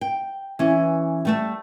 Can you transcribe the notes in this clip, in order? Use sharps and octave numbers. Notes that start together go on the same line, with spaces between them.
G5
E3 C#4
G3 A3 A5